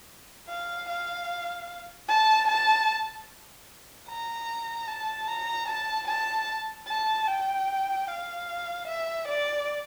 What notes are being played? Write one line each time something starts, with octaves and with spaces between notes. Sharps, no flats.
F5
F5
A5
A5
A#5
A5
A#5
A5
A5
A5
G5
F5
E5
D5